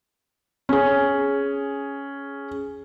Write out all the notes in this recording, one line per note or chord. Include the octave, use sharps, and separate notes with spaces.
C#4 G#4